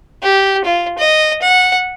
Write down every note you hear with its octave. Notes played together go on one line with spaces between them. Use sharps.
G4
F4
D#5
F#5